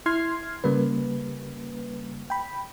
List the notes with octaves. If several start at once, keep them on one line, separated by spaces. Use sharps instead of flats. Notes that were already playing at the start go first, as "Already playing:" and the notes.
E4 C6 F6 G#6 C7
C#3 G3 A#3 B4
G5 B5